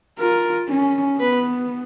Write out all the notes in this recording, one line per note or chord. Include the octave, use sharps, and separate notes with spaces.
F4 A#4
C#4
B3 B4